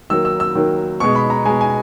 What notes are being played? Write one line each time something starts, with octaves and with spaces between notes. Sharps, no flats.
D#3 F#3 A#3 E6
E6
E6
D#3 F#3 A#3
B2 G#3 C#6
B5
A#5
B2 G#3 G#5
G#5